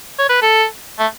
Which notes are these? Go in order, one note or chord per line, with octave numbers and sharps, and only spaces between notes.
C#5
B4
A4
A3